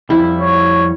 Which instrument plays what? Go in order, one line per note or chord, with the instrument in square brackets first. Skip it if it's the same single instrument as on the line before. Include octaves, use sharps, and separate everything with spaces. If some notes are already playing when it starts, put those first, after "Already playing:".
[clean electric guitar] F2 G3 [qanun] E4
[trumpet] C#5